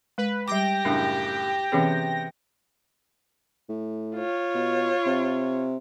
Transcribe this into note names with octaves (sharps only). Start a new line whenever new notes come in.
G#3 B4
G3 G4 G5 D6 A#6
F#2 A2 C#3 D4
C3 E3 B3 C#4 G#4
A2
F4 C#5
B2
C3